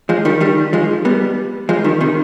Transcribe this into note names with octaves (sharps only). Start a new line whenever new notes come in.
F3 G#3
D#3 G3
D#3 G3
F3 G#3
G3 B3
F3 G#3
D#3 G3
C3 D#3